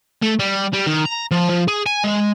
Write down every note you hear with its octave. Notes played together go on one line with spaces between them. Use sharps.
A3
G3
G3
D#3
A#5
F3
F3
G#4
G#5
G#3